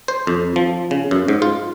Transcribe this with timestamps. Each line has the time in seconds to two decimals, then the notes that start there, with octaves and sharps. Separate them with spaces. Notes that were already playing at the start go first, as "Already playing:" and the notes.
0.08 C5
0.27 F2
0.56 F3
0.91 C#3
1.11 F#2
1.28 G#2
1.42 F4